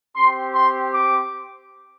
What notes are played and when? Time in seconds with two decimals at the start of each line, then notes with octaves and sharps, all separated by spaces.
0.15 C4 G4 C6
0.53 C6
0.92 D6